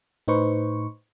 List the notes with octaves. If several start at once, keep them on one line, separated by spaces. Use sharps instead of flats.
A2 D#4 B4 C5 C#6